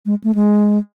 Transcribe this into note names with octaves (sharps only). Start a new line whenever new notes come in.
G#3
A3
G#3